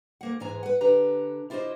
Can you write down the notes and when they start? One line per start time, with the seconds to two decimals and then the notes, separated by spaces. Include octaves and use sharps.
0.21 D2 A#3 F#5
0.40 E2 G#2 E3 G#3 G#5 A#5
0.63 B4 F#5
0.81 D3 G4 B4 A#5
1.50 E4 F4 G4 A#4 C5 D#5